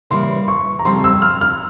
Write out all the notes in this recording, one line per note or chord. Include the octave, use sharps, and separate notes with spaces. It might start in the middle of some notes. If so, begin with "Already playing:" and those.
C#3 E3 G3 A#3 C6
C#6
A#5
F2 C#3 G3 C4 C6
E6
F6
F6